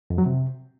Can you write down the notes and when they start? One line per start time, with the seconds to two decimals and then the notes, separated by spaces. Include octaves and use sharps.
0.10 F2
0.18 F#3
0.26 C3